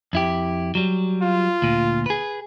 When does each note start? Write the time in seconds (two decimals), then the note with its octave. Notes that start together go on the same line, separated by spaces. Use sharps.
0.13 F2 E4 G4
0.75 F#3 G3
1.22 F4
1.62 D2 A#2
2.06 G#4 B4